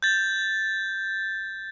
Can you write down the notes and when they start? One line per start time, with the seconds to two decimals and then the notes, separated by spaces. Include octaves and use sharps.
0.03 G6 A6